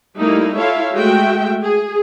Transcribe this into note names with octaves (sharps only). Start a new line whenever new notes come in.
G3 A3 A#3 D#4 E4
E4 F4 A4 C#5 E5 F5
G#3 A3 F#4 E5 G5
G#4